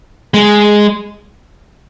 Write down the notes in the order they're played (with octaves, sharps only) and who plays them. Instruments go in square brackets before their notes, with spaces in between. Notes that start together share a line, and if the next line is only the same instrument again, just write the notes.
[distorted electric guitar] G#3